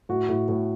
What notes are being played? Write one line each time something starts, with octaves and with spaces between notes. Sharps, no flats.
A2 F#4
A2
A2